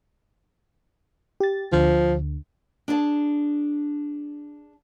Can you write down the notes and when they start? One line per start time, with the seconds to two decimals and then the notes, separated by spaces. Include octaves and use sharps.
1.40 G4 A6
1.72 D2 D3 F3
2.88 D4 G#4 A5